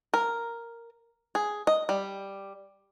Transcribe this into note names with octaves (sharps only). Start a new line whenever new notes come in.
A#4
G#4
D#5
G3